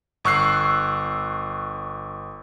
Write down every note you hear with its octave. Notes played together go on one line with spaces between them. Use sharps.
G1 C#6 E6 F#6 C7